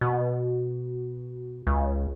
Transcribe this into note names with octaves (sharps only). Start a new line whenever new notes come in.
B2
C#2